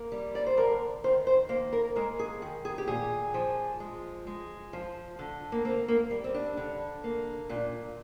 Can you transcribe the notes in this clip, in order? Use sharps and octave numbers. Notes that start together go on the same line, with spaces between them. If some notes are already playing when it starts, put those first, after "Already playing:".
Already playing: A#3
G3
D5
C5
D3 A#4
D#3 C5
C5
A#3 C5
A#4
G#3 A#4
G#4
D#3 G#4
G#4
G4
A#2 G#4
F3
G#3
G#3
F3
D3
A#3
A#3 C4
A#3
G3
C4
D4
D3
A#3
A#2 D4